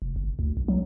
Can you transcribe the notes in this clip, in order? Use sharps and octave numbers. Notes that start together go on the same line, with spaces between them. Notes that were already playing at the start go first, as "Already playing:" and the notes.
F1
G1
D2
B1
F#3